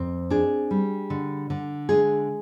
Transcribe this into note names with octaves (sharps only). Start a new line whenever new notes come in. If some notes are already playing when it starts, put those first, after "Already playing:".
Already playing: F2 C4
D4 G#4
G3
D3
D3
G#3 G#4